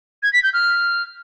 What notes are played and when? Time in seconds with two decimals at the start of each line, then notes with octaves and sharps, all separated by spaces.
0.23 G#6
0.33 B6
0.43 G6
0.54 F6